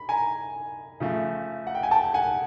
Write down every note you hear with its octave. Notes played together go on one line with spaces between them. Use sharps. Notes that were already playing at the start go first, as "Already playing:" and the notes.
Already playing: B5
G#5 A#5
C#3 F3 A3
F#5
G5
G#5
G5 A5
F#5 G#5